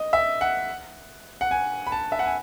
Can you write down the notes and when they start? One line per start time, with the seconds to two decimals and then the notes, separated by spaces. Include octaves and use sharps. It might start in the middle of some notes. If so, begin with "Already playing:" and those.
Already playing: D#5
0.13 E5
0.41 F#5
1.41 F#5
1.51 G#5
1.87 B5
1.92 A5
2.12 E5
2.19 F#5
2.26 G#5